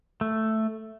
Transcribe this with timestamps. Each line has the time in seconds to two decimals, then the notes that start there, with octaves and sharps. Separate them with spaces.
0.21 A3